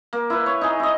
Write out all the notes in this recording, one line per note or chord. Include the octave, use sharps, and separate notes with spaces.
A#3
E4 B4
C#5
D#4 G#4
E4 D#5